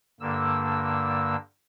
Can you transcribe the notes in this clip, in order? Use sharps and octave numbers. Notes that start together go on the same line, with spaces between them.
G2 D3 A#3 E6